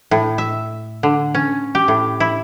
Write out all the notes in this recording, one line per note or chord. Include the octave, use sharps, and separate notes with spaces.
A2
E5
D3
C#4
G4
A2
E4